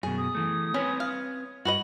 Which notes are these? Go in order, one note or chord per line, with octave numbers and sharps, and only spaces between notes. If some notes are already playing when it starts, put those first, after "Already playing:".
F#2 B2 G#4
D#6
E3 A3
C4 C#4 B4 C#5
F5
G2 F#4 B4 D#5 F#7